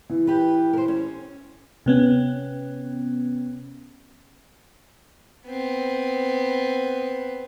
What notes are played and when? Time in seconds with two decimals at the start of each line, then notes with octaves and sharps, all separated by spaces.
0.10 E3
0.27 G4 B4
0.73 A#4 C5
0.88 C#4
1.86 C3 B3 C#4
5.47 B3 C4